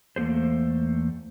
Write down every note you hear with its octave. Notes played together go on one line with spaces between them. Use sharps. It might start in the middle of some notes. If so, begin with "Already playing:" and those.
E2 A3 A#3 G#4 C5